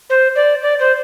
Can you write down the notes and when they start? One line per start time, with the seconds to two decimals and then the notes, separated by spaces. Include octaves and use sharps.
0.09 C5
0.35 D5
0.62 D5
0.79 C5